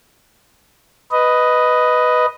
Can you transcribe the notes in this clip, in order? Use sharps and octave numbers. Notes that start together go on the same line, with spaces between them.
B4 D#5